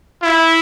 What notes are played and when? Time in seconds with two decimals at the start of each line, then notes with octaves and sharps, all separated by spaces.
0.23 E4